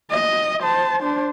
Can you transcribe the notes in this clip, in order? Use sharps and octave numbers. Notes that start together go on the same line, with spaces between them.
D#5
C5 A5
D4 C5